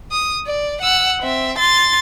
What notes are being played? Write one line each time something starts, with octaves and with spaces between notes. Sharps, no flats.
D#6
D5
F#5 E6
C4 E5
C6 A6